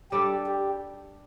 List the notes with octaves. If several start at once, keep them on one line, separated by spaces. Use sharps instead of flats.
G3 D4 G4 A4
G4